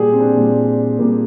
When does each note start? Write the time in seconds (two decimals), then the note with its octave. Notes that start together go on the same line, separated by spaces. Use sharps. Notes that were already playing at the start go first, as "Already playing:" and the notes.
Already playing: A#2 G3 G4 G#4
0.12 C4
0.20 D4
0.36 A#2 G3
0.98 A#2 G3 A#3